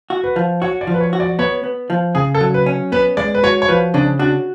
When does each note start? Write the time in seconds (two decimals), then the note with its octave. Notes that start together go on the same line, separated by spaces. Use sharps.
0.10 F#4
0.24 B4
0.36 F3
0.62 F#4 C#5
0.81 D5
0.87 F3
0.94 B4
1.01 C#5
1.13 F#4
1.20 D5
1.39 B3 C#5
1.64 B3
1.90 F3
2.15 C#3 G#4
2.34 A4
2.41 F#3
2.54 B4
2.66 C#4
2.92 B3 B4
3.17 G#3 D5
3.34 B4
3.43 F#4 C#5
3.62 C#5
3.68 F3 B4
3.94 C#3 D4
4.19 D4 F#4